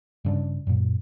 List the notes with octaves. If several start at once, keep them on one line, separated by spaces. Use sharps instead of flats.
G2 C#3 D4
F#2 A#2